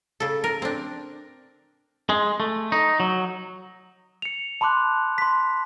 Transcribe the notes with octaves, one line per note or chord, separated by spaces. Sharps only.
C#3 A4
A#4
C4 D4
G#3
A3
D#4
F#3
C#7 F7
A5 B5 C6 D6 F#6
C6 B6